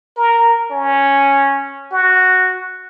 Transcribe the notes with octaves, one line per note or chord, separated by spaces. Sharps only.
A#4
C#4
F#4